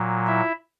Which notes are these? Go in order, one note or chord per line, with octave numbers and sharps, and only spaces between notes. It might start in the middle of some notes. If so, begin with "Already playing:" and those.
Already playing: A#2 F#3
E4 E5